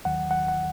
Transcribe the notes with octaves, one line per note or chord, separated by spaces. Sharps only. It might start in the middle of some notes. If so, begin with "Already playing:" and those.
D#2 D#3 F#3 F#5
F#5
F#5